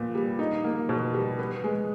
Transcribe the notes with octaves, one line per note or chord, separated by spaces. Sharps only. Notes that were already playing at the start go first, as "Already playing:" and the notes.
Already playing: A#2 B3
G3
D#4
A#3
B2
G3
B3
G#3